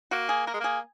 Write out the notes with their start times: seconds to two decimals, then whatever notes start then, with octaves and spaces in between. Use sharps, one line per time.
0.11 A#3 F#4
0.29 G#4
0.46 A#3 A#4
0.54 G#3
0.60 A#3 G#4